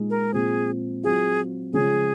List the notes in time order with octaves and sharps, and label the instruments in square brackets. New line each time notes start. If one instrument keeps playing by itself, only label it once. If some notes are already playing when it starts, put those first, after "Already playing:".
Already playing: [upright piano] A#2 G#3 D#4
[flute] A#4
[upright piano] A#2 F3 C4 [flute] G#4
[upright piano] F#3 C4 F4 [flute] G#4
[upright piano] C#3 F3 G#3 [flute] G#4